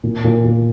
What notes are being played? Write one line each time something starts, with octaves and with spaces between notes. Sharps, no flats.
A#2
A#2
A#2